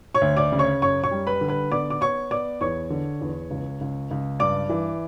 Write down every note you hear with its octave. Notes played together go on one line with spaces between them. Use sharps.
C#5 C#6
D2
D5 D6
C#3
C#5 C#6
F#2 C#5 C#6
C#5 C#6
G3
B4 B5
D3
B4 B5
B3 D5 D6
D6
B3 C#5 C#6
B3 D5 D6
E2 C#5 C#6
D3
E2
C#2
C#2
C#2
G2 D5 D6
E3